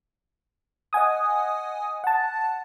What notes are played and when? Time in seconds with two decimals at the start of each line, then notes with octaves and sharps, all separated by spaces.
0.93 D#5 F#5 G#5 D#6
2.04 F#5 A5